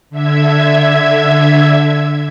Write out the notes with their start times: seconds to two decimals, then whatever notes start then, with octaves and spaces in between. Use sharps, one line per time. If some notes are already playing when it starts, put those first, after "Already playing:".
0.10 D3 E5 G#6